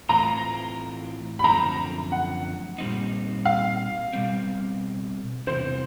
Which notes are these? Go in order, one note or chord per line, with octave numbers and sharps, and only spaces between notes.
A2 E3 A3 C4 F4 A#5
B5
F#2 D3 F3 A3 C4 A#5
F#5
A#2 G3 C4 D#4
F5
B2 G3 C4
E2 C3 E3 C5